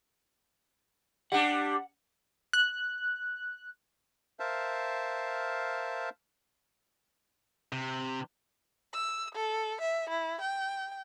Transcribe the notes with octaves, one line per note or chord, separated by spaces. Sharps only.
G3 D4 F#5
F#6
A#4 C5 E5 F5 A5
C3
E6
A4
E5
E4
G5